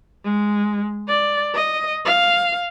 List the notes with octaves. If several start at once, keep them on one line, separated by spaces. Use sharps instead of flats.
G#3
D5
D#5
F5